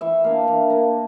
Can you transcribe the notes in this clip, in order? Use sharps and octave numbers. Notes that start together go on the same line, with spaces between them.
E3 E5
A#3 D4 F5
E3
A#3 D4